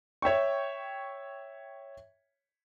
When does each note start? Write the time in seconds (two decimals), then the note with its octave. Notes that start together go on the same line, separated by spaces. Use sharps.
0.22 C#5 E5 G5 C#6